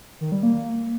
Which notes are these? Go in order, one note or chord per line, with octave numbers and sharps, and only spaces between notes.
D#3
G3
A#3